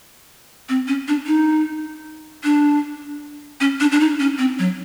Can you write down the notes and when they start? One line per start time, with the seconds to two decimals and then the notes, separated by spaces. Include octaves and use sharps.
0.69 C4
0.88 C#4
1.08 D4
1.27 D#4
2.44 D4
3.61 C#4
3.80 D4
3.92 D4
4.00 D#4
4.20 C#4
4.38 C4
4.59 F#3